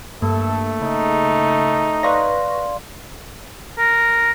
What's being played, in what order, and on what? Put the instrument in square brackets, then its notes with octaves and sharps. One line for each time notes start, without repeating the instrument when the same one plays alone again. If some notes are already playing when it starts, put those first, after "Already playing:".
[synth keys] G2 [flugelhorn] A3 [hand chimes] A#3 [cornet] A4
[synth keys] C#3 [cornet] D#4
[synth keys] B4 C#6 A#6 [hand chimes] D5 F5 C6
[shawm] A#4